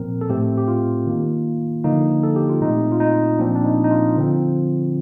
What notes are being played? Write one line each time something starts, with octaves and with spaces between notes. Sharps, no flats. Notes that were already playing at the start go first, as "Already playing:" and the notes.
Already playing: A#2 F3 C4 A#4
A4
A2 A3 C4 G4
G4
F4
D#3 A#3
D3 F3 A#3 D#4
A4
G4
F4
A#2 A3 C4 D#4
F4
D#4
A#2 F3 C4 D4
D4
D#4
D#4
F4
D3 F3 C4